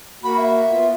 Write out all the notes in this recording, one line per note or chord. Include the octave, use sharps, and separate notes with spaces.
A#3 F#4 B5
E5
B3 F4